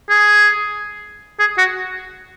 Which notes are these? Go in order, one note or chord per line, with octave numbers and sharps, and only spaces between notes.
G#4
G#4
F#4